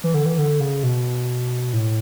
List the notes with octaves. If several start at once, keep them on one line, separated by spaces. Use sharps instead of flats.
E3
D3
E3
D3
C#3
B2
A2